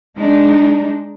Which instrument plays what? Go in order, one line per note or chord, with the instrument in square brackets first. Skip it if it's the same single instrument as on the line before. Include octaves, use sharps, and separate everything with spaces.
[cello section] G#3 D4 D#4